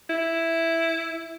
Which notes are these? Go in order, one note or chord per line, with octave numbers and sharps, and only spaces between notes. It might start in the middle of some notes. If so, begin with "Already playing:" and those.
E4